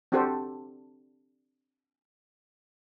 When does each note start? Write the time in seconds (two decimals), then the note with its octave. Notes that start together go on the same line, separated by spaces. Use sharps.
0.12 C4 D4 F#4 G4 A4 C5